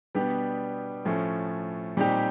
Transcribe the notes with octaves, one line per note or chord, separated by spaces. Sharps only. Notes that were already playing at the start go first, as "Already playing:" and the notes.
B2 G3 B3 D4 G4
A2 F3 A3 C#4
A#2 G3 C4 D#4 G4